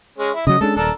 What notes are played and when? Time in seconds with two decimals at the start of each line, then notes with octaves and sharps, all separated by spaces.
0.19 G#3 C#4
0.35 E4
0.47 C#3 F#3 D#5
0.61 G#3 C#4 D4 A4
0.77 D#1 D4 A4 A#4